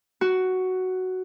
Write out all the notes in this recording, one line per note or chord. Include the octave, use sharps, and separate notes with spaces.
F#4